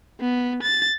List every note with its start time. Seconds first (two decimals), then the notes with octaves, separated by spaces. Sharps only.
0.20 B3
0.62 A6